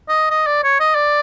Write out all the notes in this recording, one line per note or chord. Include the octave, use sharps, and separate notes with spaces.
D#5
D#5
D5
C#5
D#5
D5